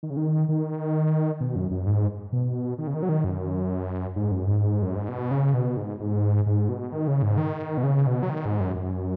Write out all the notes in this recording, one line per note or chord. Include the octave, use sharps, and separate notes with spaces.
D#3
C#3
D#3
D#3
B2
F#2
F#2
G#2
B2
D#3
C#3
D#3
F#3
D#3
F#2
G#2
F#2
G#2
F#2
G#2
B2
C#3
B2
G#2
G#2
G#2
B2
D#3
C#3
G#2
D#3
B2
C#3
B2
F#3
D#3
G#2
F#2
F#2